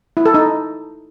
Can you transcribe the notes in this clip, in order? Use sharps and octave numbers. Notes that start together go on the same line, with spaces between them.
E4
A4
D#4